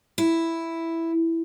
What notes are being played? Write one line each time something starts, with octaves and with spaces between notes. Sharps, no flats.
E4